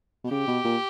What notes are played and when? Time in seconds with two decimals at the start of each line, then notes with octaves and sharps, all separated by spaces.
0.24 B2
0.31 C#3 G4
0.48 B2
0.65 A#2